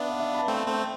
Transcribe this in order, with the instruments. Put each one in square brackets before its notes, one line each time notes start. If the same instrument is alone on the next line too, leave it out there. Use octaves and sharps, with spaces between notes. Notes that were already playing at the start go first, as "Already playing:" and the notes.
Already playing: [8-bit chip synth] B3 D4 [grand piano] D5 E5
[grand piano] F5
E5
B5
A5
[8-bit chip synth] A3 C4 [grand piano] G5
[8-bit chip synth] A3 C4